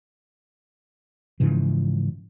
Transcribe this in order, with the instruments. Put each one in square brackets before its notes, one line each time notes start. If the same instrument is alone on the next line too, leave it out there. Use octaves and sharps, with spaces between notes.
[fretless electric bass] G#2 C#3 E3 F3